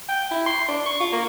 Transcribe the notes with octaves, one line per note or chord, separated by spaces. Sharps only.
G5
E4
C6
D4
C#6
F4
A#3